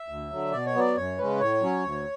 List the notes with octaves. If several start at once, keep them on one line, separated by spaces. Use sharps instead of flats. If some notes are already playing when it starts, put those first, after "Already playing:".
Already playing: E5
D2
D3 F#3
B2 D5
C#5
F#3 B3 D5
F#2 C#5
C#3 G#3 C#4 B4
A2 C#5
F#3 C#4
D2